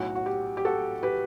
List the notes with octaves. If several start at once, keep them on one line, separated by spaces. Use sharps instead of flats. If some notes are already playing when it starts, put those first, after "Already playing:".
Already playing: B1 A2 F#3 F#4
F#4
G4
G4
F#4 A4
G4 B4